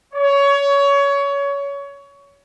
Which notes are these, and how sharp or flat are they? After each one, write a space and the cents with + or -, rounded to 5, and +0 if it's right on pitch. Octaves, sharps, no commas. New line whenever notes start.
C#5 +20